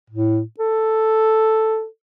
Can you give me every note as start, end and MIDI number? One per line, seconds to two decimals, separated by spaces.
0.10 0.41 45
0.60 1.85 69